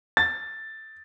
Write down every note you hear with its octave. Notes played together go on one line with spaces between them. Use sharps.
A6